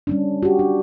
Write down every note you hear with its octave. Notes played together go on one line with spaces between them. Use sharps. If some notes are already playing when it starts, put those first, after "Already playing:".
G3 C#4 D4
F#4 G4
D4